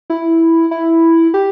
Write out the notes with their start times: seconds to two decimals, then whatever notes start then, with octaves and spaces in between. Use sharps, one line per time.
0.10 E4
0.71 E4
1.34 G4